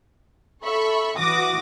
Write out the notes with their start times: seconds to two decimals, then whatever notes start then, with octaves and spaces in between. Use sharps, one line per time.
0.64 A4 E5 B5 C#6
1.18 E3 F#4 D6 D#6 A#6